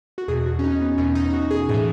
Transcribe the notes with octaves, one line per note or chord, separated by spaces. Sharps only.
F#4
E2 B2 G#4
F#4
C#4
D#4
C#4
B3
E2 B2 C#4
D#4
F#4
G#4
A2 E3 G#4